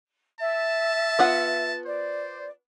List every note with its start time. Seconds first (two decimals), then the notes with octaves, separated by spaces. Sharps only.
0.40 E5 A5
1.19 B3 F4 F#5
1.86 C5 D5